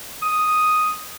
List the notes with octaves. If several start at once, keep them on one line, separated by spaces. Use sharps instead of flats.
D#6